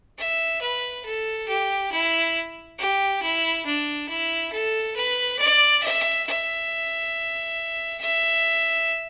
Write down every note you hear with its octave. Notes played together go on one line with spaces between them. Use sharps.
E5
B4
A4
G4
E4
G4
E4
D4
E4
A4
B4
D5
E5
E5
E5